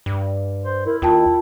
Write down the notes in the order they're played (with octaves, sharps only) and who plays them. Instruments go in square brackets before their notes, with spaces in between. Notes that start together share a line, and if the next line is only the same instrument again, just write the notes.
[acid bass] G2
[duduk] C5
[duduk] E4 [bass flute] A#4
[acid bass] D#2 [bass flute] F4 [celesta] A#4 G5 A5